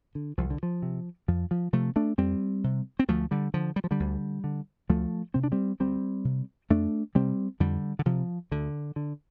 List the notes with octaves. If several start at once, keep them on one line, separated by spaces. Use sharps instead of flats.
D3
C2 F3
D3
F3
C3
F2 F3
F3
C3 F3 A3
A3 D4
F2 G3 C4
C3
C4
D2 F3 A3
D3 G3
D3 F3
G3
F3
D3 G3
D2
D3
D2 F3 A3
C3 C4
D4
G3 C4
D2 G3 C4
C3
F2 A3 D4
C3 G3 C4
F2 D3 G3
D3
C3 F3
D2 D3
D3